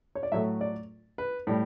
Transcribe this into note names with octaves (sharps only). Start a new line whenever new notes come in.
C#5
D5
A2 F#3 A3 E5
D5
B4
A2 G3